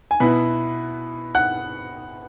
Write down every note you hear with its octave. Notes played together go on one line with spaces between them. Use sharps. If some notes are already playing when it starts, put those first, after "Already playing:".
G#5
B2 B3 E4 B4 B5
F#5 F#6